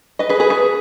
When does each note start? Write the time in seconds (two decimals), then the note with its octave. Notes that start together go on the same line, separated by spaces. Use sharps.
0.19 B4 D#5
0.29 G#4 B4
0.40 G#4 B4
0.50 G#4 B4